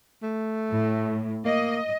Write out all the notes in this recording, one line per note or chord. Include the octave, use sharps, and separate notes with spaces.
A3
A2
A#3 D#5